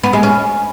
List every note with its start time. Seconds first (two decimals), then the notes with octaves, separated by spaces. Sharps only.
0.03 B3
0.13 G#3
0.23 C#4